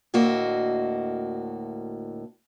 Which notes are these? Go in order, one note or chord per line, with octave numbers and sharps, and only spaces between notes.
D2 A2 A#3 F#4 D#5 E5